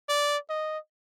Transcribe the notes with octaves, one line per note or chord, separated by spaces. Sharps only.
D5
D#5